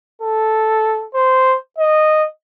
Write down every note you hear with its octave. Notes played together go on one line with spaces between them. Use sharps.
A4
C5
D#5